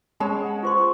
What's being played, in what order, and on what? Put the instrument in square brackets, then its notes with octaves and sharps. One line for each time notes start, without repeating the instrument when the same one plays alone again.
[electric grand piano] G#3 [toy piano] C#4 B5 [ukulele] G#4 C#5 A5
[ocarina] F#5
[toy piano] F4 C5 C6 [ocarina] C#6